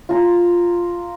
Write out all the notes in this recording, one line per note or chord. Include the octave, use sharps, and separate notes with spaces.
F4 A#5